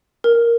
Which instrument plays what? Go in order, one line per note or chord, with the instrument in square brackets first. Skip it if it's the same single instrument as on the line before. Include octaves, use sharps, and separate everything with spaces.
[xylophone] A#4